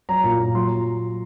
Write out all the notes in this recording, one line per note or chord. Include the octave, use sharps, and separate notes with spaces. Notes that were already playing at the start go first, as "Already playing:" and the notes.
F#3 A#5
A#2
A#2
F#3 C6